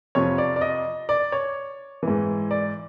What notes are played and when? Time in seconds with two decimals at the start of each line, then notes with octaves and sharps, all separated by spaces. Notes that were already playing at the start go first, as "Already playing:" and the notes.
0.15 F2 C3 F3 C#5
0.38 D5
0.56 D5
0.61 D#5
1.09 D5
1.32 C#5
2.03 G#2 E3
2.51 D5